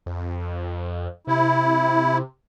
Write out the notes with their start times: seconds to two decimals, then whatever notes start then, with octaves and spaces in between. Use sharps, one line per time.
0.06 F2
1.27 C3 E4